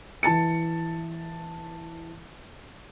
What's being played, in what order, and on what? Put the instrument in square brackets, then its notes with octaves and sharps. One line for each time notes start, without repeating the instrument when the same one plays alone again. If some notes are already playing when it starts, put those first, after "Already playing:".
[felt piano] E3 A5 A6 C#7